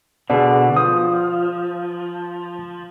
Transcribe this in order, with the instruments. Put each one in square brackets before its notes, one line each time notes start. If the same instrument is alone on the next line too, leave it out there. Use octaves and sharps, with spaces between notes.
[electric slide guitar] B2 D3 [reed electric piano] G#4 D5
[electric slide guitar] F3 [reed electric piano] D#6